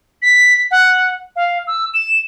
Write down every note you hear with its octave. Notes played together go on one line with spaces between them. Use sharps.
B6
F#5
F5
E6
E7